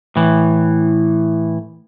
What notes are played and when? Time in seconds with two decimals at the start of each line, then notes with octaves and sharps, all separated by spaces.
0.16 A2 E3